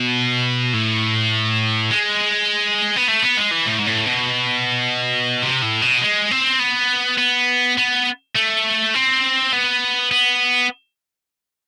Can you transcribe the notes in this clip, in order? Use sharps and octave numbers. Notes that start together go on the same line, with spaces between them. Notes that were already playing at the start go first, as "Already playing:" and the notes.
Already playing: B2
A2
G#3
B3
A3
B3
G#3
E3
A2
G#2
A2
B2
C3
A2
B2
G#3
C4
B3
B3
B3
A3
C4
B3
B3